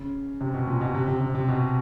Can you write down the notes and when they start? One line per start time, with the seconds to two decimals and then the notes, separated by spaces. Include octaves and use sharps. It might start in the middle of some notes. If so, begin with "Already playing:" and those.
Already playing: C#3
0.41 C3
0.54 B2
0.67 A#2
0.81 B2
0.94 C3
1.08 C3
1.21 C3
1.35 C3
1.48 B2